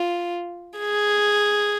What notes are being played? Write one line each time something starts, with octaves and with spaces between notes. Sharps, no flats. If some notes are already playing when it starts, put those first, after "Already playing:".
Already playing: F4
G#4